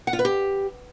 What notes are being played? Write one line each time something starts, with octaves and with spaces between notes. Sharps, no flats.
F#5
F4
B4
G4